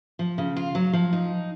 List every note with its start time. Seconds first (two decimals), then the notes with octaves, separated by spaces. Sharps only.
0.19 F3
0.38 C#3
0.57 F4
0.75 F#3
0.93 F3
1.13 D#4